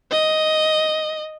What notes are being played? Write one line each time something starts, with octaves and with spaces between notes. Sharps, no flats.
D#5